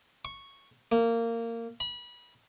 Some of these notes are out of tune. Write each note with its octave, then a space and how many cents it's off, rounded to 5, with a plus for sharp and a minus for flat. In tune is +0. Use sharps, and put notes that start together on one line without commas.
C#6 -5
A#3 -20
B5 -30